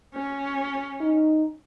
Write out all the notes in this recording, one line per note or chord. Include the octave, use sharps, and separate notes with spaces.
C#4
D#4